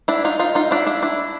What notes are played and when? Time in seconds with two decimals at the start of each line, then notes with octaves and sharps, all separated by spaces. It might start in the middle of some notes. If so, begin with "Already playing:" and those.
0.08 D4 E4
0.25 D#4 F4
0.39 D#4 F4
0.55 D#4 F4
0.71 D4 E4
0.87 D4 E4
1.02 D4 E4